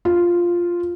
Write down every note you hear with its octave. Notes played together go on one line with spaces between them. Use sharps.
F4